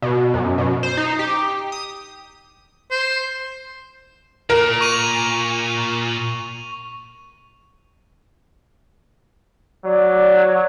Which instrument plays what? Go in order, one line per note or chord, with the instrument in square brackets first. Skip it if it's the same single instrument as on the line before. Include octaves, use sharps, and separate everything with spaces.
[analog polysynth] B2
F#2
B2
C5
D#4
G4
D#6
[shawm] C5
[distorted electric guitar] A#2 [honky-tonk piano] A#4
[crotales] C#6 D#7 F7
[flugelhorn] F#3 [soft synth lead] D5